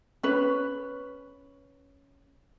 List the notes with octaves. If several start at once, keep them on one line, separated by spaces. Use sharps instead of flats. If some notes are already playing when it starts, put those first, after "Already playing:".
C#4 B4